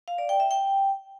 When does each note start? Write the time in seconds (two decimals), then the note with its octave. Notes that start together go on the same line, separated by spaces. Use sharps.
0.08 F5
0.18 D5
0.29 G5
0.40 E5
0.51 G5